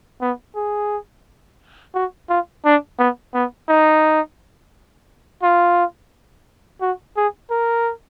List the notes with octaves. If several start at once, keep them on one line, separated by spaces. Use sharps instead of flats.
B3
G#4
F#4
F4
D4
B3
B3
D#4
F4
F#4
G#4
A#4